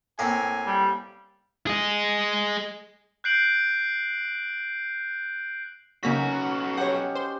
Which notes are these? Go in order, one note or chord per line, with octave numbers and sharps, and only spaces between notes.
A2 A#3 C4 G#5
G3
G#4 D#5
F#6 G6 C7 D7 F#7
B1 C#3 F#3 A#3 C#4 D#4 F#4 B6
G4 C#5 F#5
C5 C6